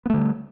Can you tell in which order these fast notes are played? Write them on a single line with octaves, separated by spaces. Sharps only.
B3 A3 D3 G3